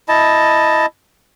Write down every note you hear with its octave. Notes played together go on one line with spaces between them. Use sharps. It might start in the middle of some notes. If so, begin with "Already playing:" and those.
E4 D#5 A5